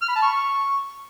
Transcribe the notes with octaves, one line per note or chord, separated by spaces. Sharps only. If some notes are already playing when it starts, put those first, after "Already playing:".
F6
B5
A5
C#6